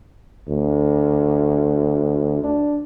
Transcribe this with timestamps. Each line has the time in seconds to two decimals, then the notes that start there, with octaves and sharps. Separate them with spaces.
0.48 D2
2.43 D4